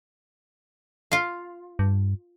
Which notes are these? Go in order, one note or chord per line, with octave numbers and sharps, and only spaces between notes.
F4 F5
G2